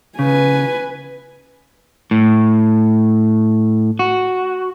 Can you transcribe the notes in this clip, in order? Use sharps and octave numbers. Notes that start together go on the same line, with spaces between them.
C#3 B4 G#5
A2
F#4